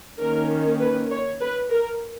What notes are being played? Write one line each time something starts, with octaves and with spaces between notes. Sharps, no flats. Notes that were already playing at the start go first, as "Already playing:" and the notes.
D#3 A#3 C#4 A#4
B4
C#5
B4
A#4